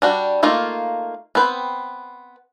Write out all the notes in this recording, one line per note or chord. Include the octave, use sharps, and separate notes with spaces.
G3 D4 F#4
A3 A#3 D#4 F4
B3 C4 B4 G5